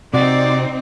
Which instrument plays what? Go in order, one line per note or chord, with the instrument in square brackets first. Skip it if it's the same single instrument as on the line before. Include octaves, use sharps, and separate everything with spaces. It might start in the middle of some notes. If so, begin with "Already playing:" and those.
[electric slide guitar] C3 F#4 [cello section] C4 D#4 [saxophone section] D5